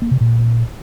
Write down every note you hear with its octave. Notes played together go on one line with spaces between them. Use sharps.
A#3
C3
A#2